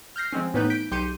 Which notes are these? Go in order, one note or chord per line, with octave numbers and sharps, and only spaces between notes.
F6 G6 A#6 C7
F3 G#3 C4 C#4
A2 E3 B3 D#4 B4 G6
G6 B6 D7
B1 G4 C6 G6 C#7 D#7